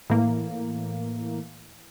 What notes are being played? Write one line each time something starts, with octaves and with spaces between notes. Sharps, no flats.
A2 E3 A#3